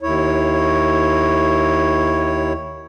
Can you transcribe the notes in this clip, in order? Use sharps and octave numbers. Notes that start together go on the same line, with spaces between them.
D#2 E4 C#5